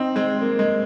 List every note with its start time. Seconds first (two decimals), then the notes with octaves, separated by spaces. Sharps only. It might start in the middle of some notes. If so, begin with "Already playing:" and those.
Already playing: C4 D#4
0.16 G#3 C4
0.42 A#3
0.59 G#3